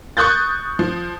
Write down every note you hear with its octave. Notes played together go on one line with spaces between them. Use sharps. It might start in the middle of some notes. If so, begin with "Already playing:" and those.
C#6 D#6 F#6 G6 A6
F3